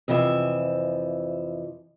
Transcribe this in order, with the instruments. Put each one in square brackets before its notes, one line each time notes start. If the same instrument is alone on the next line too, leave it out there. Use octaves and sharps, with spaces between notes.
[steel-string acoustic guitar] F2 C3 E3 F3 E5